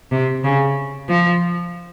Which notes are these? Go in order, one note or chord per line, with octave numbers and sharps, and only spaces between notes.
C3
C#3
F3